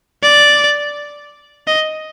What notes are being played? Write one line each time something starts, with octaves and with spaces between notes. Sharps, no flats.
D5
D#5